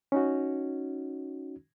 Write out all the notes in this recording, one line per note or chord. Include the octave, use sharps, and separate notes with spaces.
C#4 D#4 F#4